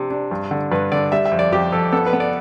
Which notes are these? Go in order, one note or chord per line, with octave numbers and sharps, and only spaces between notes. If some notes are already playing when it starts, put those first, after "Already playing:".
Already playing: C3 D4
D4
G2
D3
G2 B4
D3 D5
G3 E5
E5
F2
D5
F2 G4
F2 A4
B3 A4
B4
B3
D5